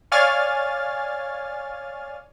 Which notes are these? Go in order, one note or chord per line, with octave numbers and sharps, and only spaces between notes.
C#5 D5 F5 G#5 F6 A6